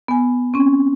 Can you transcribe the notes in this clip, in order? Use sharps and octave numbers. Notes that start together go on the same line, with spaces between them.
B3 G#5
C4 C#4